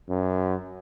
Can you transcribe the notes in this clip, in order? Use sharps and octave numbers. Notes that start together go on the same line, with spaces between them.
F#2